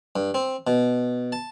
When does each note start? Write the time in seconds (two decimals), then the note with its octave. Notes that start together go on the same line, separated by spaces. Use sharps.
0.16 G2
0.34 C4
0.67 B2
1.32 A5